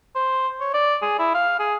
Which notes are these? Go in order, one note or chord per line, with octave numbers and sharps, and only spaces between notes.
C5
C#5
D5
G#4
E4
F5
G#4